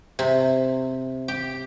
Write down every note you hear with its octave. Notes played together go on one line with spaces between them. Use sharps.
C3
G4